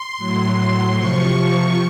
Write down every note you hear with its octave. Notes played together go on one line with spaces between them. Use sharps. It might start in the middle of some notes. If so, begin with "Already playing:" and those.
Already playing: C6
A2 F#3
C3 F3 C#6